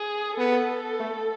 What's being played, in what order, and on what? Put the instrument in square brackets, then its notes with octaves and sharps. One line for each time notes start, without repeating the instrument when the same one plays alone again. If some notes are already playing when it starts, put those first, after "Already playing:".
Already playing: [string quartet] G#4
[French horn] B3 [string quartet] A4
[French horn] A3